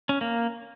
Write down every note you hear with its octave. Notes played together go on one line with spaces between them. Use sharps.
C#4
A#3